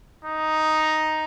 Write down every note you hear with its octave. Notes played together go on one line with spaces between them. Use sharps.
D#4